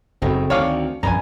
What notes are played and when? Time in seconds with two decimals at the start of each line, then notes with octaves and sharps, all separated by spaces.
0.22 F#1 F#2 A3 C4 D#4 E4 F#4
0.50 D2 D#3 D4 C#5 F5 G#5 D6
1.03 A#1 F#2 E3 G3 B3 G#5 A#5